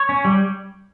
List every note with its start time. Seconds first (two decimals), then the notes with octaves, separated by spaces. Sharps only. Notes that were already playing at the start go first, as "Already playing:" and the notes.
Already playing: C#5
0.09 C#4
0.25 G3